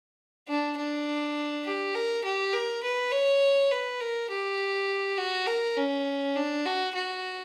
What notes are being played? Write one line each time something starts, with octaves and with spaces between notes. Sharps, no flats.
D4
D4
G4
A#4
G4
A#4
B4
C#5
B4
A#4
G4
F#4
A#4
C#4
D4
F#4
F#4